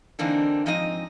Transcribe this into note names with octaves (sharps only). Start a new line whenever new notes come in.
D3 E3 A#3 C4 D4 D#4
G#2 F3 C4 D#4 D#5